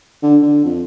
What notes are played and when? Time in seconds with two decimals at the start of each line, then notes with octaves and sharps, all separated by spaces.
0.23 D3
0.42 D3
0.65 F2